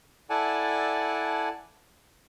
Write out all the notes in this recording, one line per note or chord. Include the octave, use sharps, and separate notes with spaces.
E4 A4 D5 F#5 G#5 A5